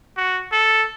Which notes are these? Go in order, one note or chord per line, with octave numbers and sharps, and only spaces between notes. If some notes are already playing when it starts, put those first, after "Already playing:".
F#4
A4